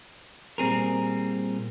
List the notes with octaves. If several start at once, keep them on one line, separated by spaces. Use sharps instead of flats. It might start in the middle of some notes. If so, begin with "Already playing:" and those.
A#2 G3 C4 G#4 A#4